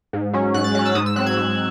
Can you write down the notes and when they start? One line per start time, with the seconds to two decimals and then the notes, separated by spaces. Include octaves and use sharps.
0.13 G#2
0.33 F#3 C#4
0.54 G#2 F#6
0.64 A6
0.75 F#3 F#6
0.79 C#4
0.85 E6
0.95 G#2 D#6
1.06 E6
1.16 F#3 C4 F#6
1.26 G#6
1.37 G#2